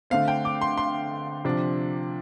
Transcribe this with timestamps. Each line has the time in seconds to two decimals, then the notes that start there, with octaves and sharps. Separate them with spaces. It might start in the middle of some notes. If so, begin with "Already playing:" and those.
0.10 D3 A3 C4 F5
0.28 G5
0.45 D6
0.61 C6
0.77 C6
1.45 C3 F3 D4